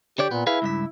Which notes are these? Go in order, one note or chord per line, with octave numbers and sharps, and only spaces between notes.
D3 G4 C#5 D5
A#2 B3
E4 G#4 B4 F5
C#2 G2 E5